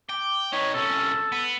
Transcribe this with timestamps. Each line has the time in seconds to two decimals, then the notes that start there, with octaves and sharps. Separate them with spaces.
0.09 G5 D6
0.53 D#4 B4 C#5
0.74 C2 C#4 A4
1.32 B3